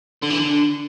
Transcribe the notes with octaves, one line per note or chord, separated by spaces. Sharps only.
D3
E3
D3